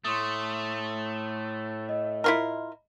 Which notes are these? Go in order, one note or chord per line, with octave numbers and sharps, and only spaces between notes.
A2 A3 C6 C#6 D#6
D#5
E4 F4 A#4